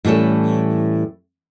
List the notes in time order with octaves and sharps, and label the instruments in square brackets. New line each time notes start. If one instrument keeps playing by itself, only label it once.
[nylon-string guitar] A2 E3 G3 C#4 A4